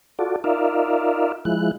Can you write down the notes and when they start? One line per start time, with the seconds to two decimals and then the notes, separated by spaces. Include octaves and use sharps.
0.19 F4 F#4 A4 D5
0.44 D#4 F4 A#4 D5 E5 F5
1.45 F3 G#3 E4 F#6